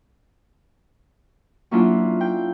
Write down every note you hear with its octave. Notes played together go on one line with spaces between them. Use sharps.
F#3 A#3 C#4 D4 E4 F4
G5